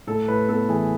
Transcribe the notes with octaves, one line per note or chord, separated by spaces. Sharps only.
A2 A4
A2 B4
B3 A4
E3 G#4